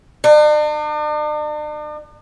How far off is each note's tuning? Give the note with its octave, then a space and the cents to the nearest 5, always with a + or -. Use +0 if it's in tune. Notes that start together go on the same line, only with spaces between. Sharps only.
D4 +45